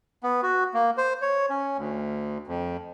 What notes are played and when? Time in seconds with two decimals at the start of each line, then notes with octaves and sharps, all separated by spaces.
0.23 B3
0.43 F#4
0.74 A#3
0.98 C5
1.22 C#5
1.50 C#4
1.77 D2
2.47 F2